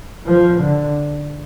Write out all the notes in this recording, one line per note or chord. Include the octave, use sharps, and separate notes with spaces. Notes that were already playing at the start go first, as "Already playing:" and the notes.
F3
D3